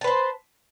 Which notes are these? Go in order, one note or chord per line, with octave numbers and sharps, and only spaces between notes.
B4 C5 A5